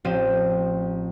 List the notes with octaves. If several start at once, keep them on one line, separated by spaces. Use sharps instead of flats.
A1 F3 C4 G5 D#7